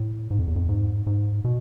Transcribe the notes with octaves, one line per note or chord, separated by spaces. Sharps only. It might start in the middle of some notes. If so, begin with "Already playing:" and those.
Already playing: A2
G#2
F2
E2
F2
G#2
G#2
B2